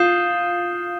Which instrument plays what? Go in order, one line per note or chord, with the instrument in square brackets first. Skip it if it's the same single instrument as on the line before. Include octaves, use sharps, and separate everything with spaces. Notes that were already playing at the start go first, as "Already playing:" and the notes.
Already playing: [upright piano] F4 [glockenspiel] D#6 G6 C7 E7 G7